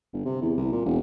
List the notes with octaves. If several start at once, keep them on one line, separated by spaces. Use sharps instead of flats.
G1
C3
E2
C2
A#2
E1